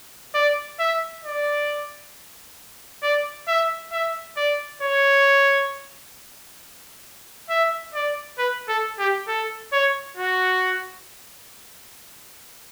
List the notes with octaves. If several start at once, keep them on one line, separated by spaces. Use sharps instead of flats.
D5
E5
D5
D5
E5
E5
D5
C#5
E5
D5
B4
A4
G4
A4
C#5
F#4